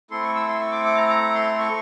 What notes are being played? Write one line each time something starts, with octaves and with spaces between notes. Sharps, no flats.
A3 C4 E4 A4 C6
C#6
E6
C6
C#6
D6
D6
A#5
A#5
C6
C#6